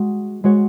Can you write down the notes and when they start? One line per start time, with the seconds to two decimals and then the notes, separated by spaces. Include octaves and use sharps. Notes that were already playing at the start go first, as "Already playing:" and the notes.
Already playing: G#3 F#4
0.44 G#3 F#4 C#5